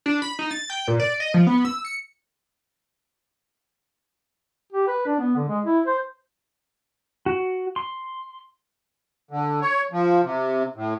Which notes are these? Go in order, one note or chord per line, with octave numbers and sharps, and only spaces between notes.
D4
B5
D#4
A6
G5
A#2
D5
D#5
F3
B3
E6
C#7
G4
B4
D4
B3
D3
G#3
E4
C5
F#4
C6
D3
C#5
F3
C3
A2